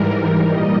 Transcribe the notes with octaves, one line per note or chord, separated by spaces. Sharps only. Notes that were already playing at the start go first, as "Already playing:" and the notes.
Already playing: G#2 E3 G3 A#4
A#2 G3 D#5